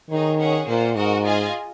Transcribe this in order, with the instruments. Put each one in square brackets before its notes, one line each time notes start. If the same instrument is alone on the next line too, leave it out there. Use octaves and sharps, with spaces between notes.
[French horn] D#3 [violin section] D#4 G#4 C#5
[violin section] C#4 G#4 C#5 F#5
[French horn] A#2 [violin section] A#3 F4 C5 F#5
[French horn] G#2 [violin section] F#4 A#4 D#5 F#5
[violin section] F4 G#4 D#5 G#5